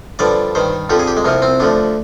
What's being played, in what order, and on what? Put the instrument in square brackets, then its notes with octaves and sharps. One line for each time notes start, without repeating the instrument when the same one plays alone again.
[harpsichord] G2 D3 F3 D5
G2 D#3 C5
F2 D3 F3 G4
G#4
G4
G#3
C2 C3 F3 A#3
C4
D2 D3 F3 D4